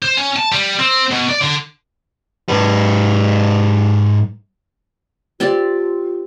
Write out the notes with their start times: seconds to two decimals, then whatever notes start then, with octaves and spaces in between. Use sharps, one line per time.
0.02 C5
0.17 C#4
0.36 A5
0.52 G3
0.79 C4
1.11 B2
1.29 D5
1.42 D3
2.49 G#2 B4
5.40 C4 F4 G4 D5